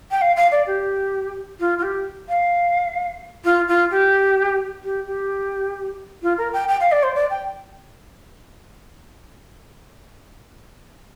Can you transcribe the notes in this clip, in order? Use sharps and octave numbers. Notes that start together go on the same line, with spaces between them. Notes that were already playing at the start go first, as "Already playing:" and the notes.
G5
F5
F5
D5
G4
F4
F4
G4
F5
F4
F4
G4
G4
G4
F4
A#4
G5
G5
F5
D5
C5
D5
G5